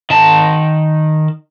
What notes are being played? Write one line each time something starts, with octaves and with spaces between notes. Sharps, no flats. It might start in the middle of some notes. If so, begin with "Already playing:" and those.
D#3 A5